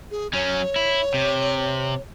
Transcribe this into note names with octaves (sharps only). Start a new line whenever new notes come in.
G#4
F#3 C#4 C#5
E4
C3